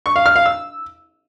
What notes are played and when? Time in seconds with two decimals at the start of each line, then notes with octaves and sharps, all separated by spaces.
0.06 C#6
0.16 F5
0.26 F6
0.36 F5
0.46 E6